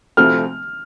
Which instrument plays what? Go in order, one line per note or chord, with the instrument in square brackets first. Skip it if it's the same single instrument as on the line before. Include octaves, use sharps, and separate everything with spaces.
[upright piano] D2 C3 F3 A3 C4 [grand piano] F6